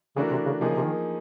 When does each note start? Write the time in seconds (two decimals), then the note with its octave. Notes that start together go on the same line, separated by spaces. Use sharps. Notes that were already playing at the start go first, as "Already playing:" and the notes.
0.16 C#3 E3 A3 D4 F#4 A#4
0.31 C3
0.46 C#3
0.61 C3 F3 A#3 D#4 G#4
0.69 C#3
0.76 C3
0.84 D#3